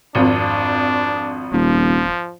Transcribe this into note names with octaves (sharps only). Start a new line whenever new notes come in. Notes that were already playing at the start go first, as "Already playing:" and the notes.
G#1 F2 D4
D#1 F3